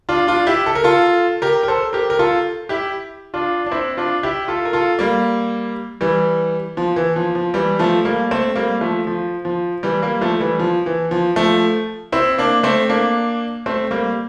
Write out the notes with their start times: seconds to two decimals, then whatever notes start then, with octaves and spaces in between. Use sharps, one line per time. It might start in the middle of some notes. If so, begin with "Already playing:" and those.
0.09 D4 F4
0.27 D4 F4
0.47 E4 G4
0.66 A4
0.75 A#4
0.84 F4 A4
1.42 G4 A#4
1.63 A#4
1.68 A4 C5
1.93 G4 A#4
2.10 A#4
2.19 F4 A4
2.69 E4 G4
3.34 D4 F4
3.66 D4
3.72 C4 E4
3.97 D4 F4
4.23 E4 G4
4.48 F4 A4
4.65 A#4
4.73 F4 A4
4.99 G3 A#3
6.01 E3 G3
6.77 F3
6.96 E3
7.16 F3
7.35 F3
7.54 E3 G3
7.79 F3 A3
8.05 G3 A#3
8.31 A3 C4
8.56 G3 A#3
8.81 F3 A3
9.07 F3
9.45 F3
9.83 E3 G3
10.02 G3 A#3
10.21 F3 A3
10.40 E3 G3
10.59 F3
10.86 E3
11.11 F3
11.36 F3 A3
12.12 C4 E4
12.38 A#3 D4
12.63 A3 C4
12.89 A#3 D4
13.66 A3 C4
13.91 G3 A#3